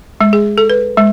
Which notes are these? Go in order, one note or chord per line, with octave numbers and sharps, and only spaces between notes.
G#3
G#4
A4
B4
G#3